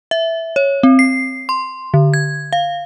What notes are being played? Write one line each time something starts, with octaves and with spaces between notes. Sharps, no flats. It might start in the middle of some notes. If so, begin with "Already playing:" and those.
E5
C#5
C4
C7
C6
D3
G#6
F5